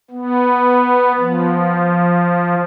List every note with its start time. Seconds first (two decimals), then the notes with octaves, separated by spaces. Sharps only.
0.11 B3
1.18 F3